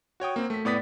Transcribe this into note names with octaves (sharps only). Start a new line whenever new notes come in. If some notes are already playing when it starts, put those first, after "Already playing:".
F#4 C#5 G5 D#6
A#3 C4
A3 B6
A2 B3 D5 D#6 A6 B6